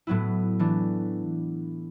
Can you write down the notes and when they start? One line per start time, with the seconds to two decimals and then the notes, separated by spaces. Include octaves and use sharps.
0.07 A2 F#3 B3 E4
0.59 E3 A3 D4